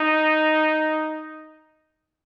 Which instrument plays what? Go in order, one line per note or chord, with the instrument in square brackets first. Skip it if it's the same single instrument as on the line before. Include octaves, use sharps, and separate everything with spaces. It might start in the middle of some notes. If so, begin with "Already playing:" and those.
Already playing: [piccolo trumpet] D#4